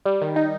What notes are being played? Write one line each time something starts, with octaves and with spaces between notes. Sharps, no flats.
G3
D#3
D#4